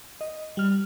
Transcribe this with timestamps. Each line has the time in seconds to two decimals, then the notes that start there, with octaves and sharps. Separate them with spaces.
0.21 D#5
0.57 G3 F6